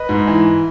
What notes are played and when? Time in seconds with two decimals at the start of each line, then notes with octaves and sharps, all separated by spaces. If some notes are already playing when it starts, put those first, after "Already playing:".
Already playing: B4 D#5
0.09 G#2
0.27 E3